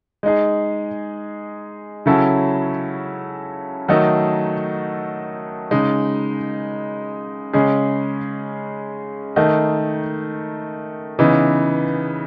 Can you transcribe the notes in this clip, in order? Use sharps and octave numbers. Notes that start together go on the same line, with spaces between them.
G#3 D#4 G#4
C#3 F#3 C#4 E4 A4
D#3 F#3 A3 D#4 A4
C#3 G#3 D#4
C#3 G#3 C#4 G#4
D#3 A3 D#4
C#3 E3 B3 D#4